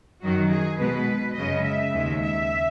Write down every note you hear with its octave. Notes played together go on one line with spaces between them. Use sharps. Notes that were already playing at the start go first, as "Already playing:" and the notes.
F#2 D#3 F#3 F#4
G#4
B2 G#3 B4
F#2 C#3 G#3 D#5
E5
D#2 C#3 G#3
E5